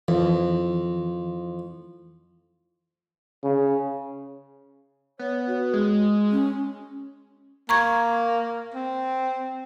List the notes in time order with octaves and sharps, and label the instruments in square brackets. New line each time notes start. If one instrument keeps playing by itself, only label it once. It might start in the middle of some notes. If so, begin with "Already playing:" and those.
[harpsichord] F2 [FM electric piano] E3
[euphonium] C#3
[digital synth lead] B3 [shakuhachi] C#5
[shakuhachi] F#4
[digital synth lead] G#3
[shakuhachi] C#4
[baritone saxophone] A#3 [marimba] A#5 C#6 G#6
[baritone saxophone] C4